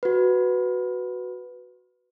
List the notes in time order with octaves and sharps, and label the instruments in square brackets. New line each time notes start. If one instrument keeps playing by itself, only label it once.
[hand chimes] F#4 B4